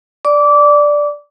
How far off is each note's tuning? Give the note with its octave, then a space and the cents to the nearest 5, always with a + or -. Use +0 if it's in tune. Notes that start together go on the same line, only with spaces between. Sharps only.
D5 +0 D6 -20